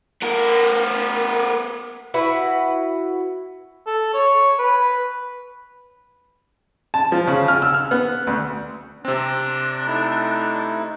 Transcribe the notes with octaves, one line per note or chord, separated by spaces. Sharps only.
B3 A#4
E4 F#4 B4
A4
C#5
B4
A5
F3
C#3
F6
E6
F6
B3
D2
C3 C4 D4
A3 D#4 E4